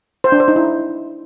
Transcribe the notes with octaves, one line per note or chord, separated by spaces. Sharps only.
C5
D4
C5
D#4
E4